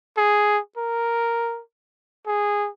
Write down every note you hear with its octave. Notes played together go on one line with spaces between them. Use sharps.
G#4
A#4
G#4